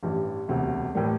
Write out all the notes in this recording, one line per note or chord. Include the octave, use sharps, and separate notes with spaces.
A1 G2 E3
E1 D2 C3
A2 E3 G3 A#3